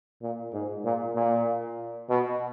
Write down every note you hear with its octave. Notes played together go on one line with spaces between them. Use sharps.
A#2
G#2
A#2
A#2
B2